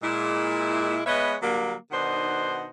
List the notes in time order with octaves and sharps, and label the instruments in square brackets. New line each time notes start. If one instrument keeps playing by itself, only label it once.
[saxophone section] A#2 G#3 E4
G#3 B3 B4 C#5 D#5 E5
D3 F#3 G3 A#3
B2 D#3 D4 D#4 C5 F#5